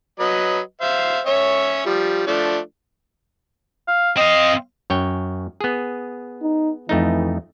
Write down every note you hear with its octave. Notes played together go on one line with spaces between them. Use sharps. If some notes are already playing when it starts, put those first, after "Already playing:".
F#3 B4 D#5
C5 E5 F5
C#4 C#5 E5
F3 G3
F3 A3 D4
F5
C4 D#5 F5
F#2 C#5 G5
B3 G#4
D#4
F2 E3 A3 D#4